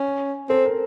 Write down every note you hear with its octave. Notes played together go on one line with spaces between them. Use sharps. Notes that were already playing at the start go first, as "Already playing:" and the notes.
Already playing: C#4
C4 A4
A#4